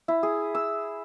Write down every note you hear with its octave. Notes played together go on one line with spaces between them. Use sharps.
E4
G#4
E6